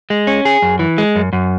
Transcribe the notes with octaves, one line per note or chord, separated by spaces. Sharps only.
G#3
C#4
G#4
F#2
E3
G#3
F#2
F#2